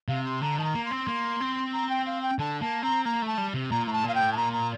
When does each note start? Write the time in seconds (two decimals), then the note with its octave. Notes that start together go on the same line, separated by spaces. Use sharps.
0.08 C3 F5
0.25 C6
0.42 D3 A#5
0.58 D#3 A5
0.64 A#5
0.75 A#3
0.85 C6
0.91 C4
1.07 A#3
1.40 C4
1.73 A#5
1.89 G5
2.06 F5
2.22 G5
2.39 D3 A5
2.61 A#3 A5
2.82 C4 A#5
3.05 A#3 A#5
3.22 A3 A5
3.38 G3
3.54 C3
3.71 A#2 A#5
3.87 A2 A#5
3.93 A5
4.04 A#2 F5
4.15 G5
4.20 A2
4.33 A5
4.36 A#2 A#5
4.53 A#5